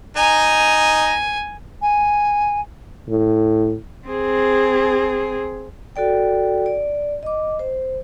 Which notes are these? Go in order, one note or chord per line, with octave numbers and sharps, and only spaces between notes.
D#4 G#5 A#5
G#5
A2
C4 G#4
F#4 A4 D5 G5
D5
D#5 D6
C5